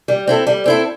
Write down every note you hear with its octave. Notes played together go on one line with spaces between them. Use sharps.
G3
C4 E4 A4
G3
C4 E4 A4